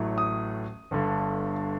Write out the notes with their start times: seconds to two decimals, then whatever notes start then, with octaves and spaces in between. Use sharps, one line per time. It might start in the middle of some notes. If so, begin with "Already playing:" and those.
Already playing: A1 A2 F#3 A3
0.18 D#6
0.91 G1 G2 D3